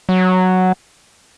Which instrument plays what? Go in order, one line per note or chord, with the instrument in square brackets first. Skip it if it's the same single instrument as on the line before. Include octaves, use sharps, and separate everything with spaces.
[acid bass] F#3